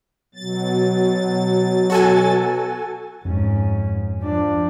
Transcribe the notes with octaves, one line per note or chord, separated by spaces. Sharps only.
B2 F#3 A6
F#4 A4 G#5
F2 G#2 C#4
F3 D4